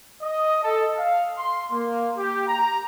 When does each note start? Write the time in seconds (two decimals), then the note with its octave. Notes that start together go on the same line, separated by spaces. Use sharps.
0.22 D#5
0.62 A4
0.96 F5
1.36 C6
1.72 A#3
2.16 G4
2.47 A#5